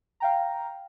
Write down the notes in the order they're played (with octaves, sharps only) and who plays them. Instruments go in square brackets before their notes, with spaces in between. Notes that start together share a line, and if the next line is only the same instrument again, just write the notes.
[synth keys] F5 G5 A#5